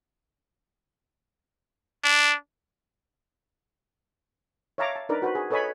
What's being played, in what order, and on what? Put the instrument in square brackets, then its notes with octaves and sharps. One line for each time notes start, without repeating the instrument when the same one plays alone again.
[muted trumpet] D4
[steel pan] C#5 E5 F5 A5 A#5 D6
A5
D4 D#4 A#4 B4 D5
F#4 B4 C5
G#4
A4 B4 C#5 D#5 G#5 B5